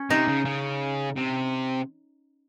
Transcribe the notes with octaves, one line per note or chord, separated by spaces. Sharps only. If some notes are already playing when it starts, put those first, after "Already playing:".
Already playing: C#4
C3 D#4
C#3
C#3
C3